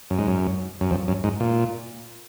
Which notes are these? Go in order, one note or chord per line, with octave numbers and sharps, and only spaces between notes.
F#2
G#2
F#2
F#2
F2
F#2
G#2
A#2